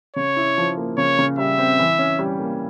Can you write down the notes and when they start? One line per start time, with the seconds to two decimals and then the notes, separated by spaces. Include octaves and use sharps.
0.16 C#3 C#5
0.37 E4
0.58 F3
0.77 A#3
0.98 C#3 C#5
1.19 C#3
1.38 G3 E5
1.59 C4
1.79 E3
1.99 C#4
2.19 G3
2.39 A#3